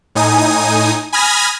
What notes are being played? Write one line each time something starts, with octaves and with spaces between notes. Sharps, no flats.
A2 D#4 G#5 D#6
G#5 B5 D#6 F6 G#6 A#6